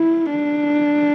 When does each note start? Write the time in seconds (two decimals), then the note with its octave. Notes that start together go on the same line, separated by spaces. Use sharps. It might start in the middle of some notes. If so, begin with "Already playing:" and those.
Already playing: E4
0.31 D4